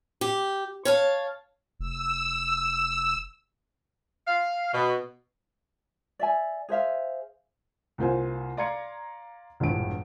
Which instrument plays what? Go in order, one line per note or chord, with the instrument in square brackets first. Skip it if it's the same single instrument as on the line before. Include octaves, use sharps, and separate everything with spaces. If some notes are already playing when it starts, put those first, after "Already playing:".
[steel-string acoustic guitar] G4
C#5 F5 A5
[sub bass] F1 [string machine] E6
[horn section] F5
B2
[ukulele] D5 E5 G#5
G#4 C5 E5 F5
[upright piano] C2 A#3 F4 C5 G#5
D5 F5 A#5 C6 G#6 C#7
E1 A#1 G2 E3 D7